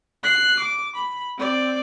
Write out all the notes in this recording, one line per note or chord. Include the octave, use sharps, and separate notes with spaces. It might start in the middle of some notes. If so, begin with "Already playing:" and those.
F#6 C7
D6
B5
C4 D5